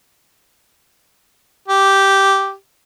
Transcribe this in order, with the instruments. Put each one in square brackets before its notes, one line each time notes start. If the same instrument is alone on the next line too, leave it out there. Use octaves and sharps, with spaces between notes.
[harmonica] G4